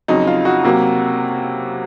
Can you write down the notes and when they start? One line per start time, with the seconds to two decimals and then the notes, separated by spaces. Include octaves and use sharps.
0.08 F2 C#3 F#3 D#4
0.27 F4
0.45 F#4
0.64 C3 F#3 A#3